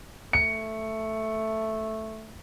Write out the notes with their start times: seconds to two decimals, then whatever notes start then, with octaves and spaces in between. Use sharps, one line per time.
0.33 A3 C#7